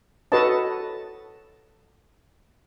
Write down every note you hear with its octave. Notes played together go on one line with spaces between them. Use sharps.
F#4 A4 B4 C#5 D#5 A5